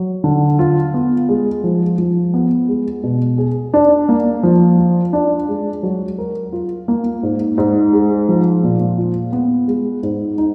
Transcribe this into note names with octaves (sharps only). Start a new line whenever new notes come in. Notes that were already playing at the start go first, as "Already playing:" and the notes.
Already playing: F#3
D3
F4
B3
G#3
F3
F3
B3
G#3
B2
G#4
D4
A#3
F3
F4
D4
G#3
F#3
A#4
F4
A#3
G#2
G#2
G#3
F3
A#2
F4
B3
G#3
G#2
D#4